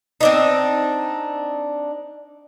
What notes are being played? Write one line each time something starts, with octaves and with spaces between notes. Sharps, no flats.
C4 D4 D#4